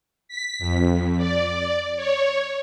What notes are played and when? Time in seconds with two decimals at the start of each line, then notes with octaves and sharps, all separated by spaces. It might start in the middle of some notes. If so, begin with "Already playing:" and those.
0.28 B6
0.59 F2
1.17 D5
1.96 C#5